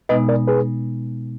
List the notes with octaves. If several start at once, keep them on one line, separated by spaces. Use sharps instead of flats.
B2 G#3 B3 D#4 B4 D#5
A#4 D5
G#4 B4